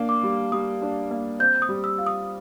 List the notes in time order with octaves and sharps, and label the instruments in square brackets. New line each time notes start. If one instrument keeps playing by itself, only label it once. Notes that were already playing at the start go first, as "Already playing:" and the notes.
Already playing: [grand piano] A#3 D4
[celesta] D6
[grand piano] G3
[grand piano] G3 [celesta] D#6
[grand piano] D4
A#3
[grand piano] C4 [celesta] G6
[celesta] D#6
[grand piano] G3
[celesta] E6
[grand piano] F4
[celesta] D#6